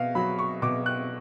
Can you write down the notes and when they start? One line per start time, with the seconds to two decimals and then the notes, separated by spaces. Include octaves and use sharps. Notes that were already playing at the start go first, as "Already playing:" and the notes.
Already playing: B2 F5
0.15 F#3 B5
0.39 C#6
0.62 B2 D6
0.86 F#6